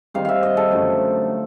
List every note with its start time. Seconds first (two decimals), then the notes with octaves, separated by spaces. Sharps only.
0.14 D#3 G3 C4 D#4 F5
0.25 E5 F5
0.43 D#5
0.57 A4
0.71 F#2 D3 F3 A3